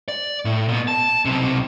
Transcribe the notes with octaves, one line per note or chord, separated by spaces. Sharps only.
D5
A2
A#2 B3
A5
B1 C3